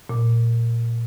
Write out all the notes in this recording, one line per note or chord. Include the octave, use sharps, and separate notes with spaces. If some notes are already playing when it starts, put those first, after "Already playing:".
A#2